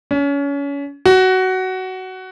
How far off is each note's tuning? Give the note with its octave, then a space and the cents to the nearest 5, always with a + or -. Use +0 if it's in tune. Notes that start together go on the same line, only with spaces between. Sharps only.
C#4 +30
F#4 +15